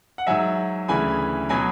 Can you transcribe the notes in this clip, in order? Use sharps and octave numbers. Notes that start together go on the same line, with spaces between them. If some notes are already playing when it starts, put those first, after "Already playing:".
F#5
G#2 F#3 E5 G#5
D2 C#3 E3 G#5 B5
B2 F#3 G#5 B5